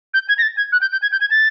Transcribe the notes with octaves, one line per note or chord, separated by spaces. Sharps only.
G6
G#6
A#6
A6
G#6
F#6
G6
G6
G#6
G6
G#6
A6